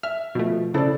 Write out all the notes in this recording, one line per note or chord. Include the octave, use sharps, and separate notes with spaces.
E5 F6
B2 F3 A3
C#3 E4 A4 C5 D5